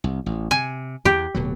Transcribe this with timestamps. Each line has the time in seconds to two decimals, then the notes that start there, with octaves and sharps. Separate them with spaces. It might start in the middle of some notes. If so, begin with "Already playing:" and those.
0.04 C2
0.26 A1
0.51 C3 G#5
1.05 E2 G4
1.34 D1 B2 F#3